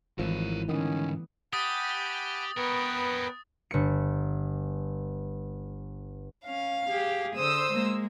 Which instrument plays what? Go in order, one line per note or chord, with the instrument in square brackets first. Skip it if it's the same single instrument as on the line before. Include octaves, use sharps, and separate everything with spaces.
[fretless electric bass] G#1 F3 [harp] E3 A3 [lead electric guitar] A#4 C#5
[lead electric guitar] G#2 D3 [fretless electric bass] D#3 [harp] G3 B3 D#6 [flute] C#4
[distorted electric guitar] G4 [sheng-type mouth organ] F#5 G#5 B5 [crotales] D#6 A6
[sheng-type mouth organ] B3 B4 G5 [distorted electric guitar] A#4 C#5
[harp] G1 C#7
[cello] C#4 [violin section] F5
[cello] G4 G#4
[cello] D3 [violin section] C5 D#6 E6
[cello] G#3 A#3